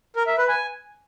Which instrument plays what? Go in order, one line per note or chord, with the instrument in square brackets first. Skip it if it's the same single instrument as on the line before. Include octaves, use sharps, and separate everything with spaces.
[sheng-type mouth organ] A#4
E5
B4
G#5